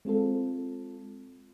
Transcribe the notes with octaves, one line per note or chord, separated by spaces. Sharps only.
G#3 C4 F4 A4